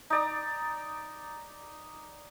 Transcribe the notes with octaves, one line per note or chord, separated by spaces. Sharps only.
D#4 D5 A#5